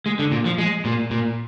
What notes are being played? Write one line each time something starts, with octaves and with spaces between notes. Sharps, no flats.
G#3
D3
A#2
F3
G#3
A#2
A#2